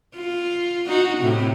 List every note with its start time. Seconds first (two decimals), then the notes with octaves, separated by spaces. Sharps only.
0.16 F4
0.88 D#4 F#4
1.18 A2 C3